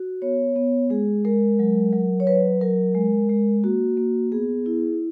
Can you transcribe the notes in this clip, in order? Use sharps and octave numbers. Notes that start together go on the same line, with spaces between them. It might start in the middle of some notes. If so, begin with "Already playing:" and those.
Already playing: F#4
B3 C#5
B3
G#3 G#4
G#3 A#4
F#3
F#3
C#5
F#3 B4
F#3 A#4
G#3
G#3
A#3 F#4
A#3
B3 G#4
E4